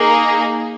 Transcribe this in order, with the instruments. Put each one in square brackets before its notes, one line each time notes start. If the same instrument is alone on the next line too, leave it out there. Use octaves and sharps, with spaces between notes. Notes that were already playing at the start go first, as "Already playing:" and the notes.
Already playing: [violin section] A#3 D#4 G#4